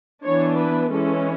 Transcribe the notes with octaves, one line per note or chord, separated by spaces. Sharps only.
E3 B3 D4 C#5
B4
E3 G#3 C#4 A4